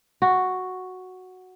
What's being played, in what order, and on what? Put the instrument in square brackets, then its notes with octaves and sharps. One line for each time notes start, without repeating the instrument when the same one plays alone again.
[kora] F#4